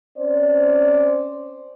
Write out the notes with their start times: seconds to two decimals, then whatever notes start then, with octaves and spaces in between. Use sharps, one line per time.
0.17 C4 C#4 C5 D5